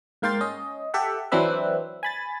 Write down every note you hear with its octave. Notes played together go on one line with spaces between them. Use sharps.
G#2 A#3 F5 G5 C6 A6
C#4 D#5
G4 A4 E5 F#5
E3 F#3 C4 D4 B4 E5
G#5 B5 A6